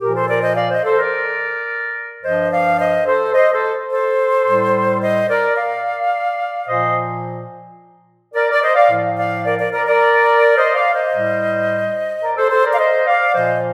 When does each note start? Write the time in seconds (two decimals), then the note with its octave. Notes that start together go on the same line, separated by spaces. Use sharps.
0.01 A#2 F3 G4 A#4
0.15 A4 C5
0.28 A#4 D5
0.42 C5 D#5
0.56 D5 F5
0.70 C5 D#5
0.84 A4 C5
0.98 A#4 D5
2.23 G2 F3 C5 D#5
2.51 D5 F5
2.79 C5 D#5
3.07 A4 C5
3.34 C5 D#5
3.52 A4 C5
3.90 A4 C5
4.45 A2 G3
5.01 C5 D#5
5.28 A#4 D5
5.56 D5 F5
6.67 A#2 F3 C5 D#5
8.34 A#4 D5
8.52 D5
8.62 C5 D#5
8.75 D5 F5
8.90 A2 F3
9.17 D5 F5
9.45 A#4 D5
9.59 A#4 D5
9.73 A#4 D5
9.87 A#4 D5
10.56 C5 D#5
10.74 D5 F5
10.93 C5 D#5
11.12 A2 G3
12.23 A#4 D5
12.37 A4 C5
12.51 A4 C5
12.65 A#4 D5
12.72 F5
12.78 C5 D#5
13.06 D5 F5
13.34 A#2 F3 C5 D#5